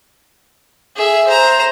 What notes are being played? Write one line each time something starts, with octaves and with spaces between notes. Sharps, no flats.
G#4 E5
C5 A#5